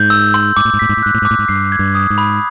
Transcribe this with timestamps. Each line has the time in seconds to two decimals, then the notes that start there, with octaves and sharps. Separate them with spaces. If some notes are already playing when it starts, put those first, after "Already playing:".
Already playing: G#2 G6
0.10 E6
0.34 C6
0.57 G#2 D6
0.65 A2
0.74 G#2
0.79 A2 B6
0.89 G#2
0.97 A2
1.03 G#2 F#6
1.14 A2
1.22 G#2 D6
1.31 A2
1.39 G#2
1.48 G2 C7
1.72 G#6
1.79 G2
1.95 D#6
2.10 G#2
2.18 B5